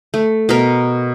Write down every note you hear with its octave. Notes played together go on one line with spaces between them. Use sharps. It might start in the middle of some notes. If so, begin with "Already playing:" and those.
A3
B2 A#4